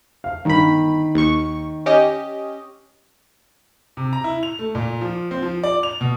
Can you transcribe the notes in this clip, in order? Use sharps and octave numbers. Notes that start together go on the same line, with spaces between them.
F5
G1 D#3 B5
D#2 C#6
C#4 G4 D#5
C3
A#5
E4
F7
A3
A#2
F3
C4
F3
D5
F7
B2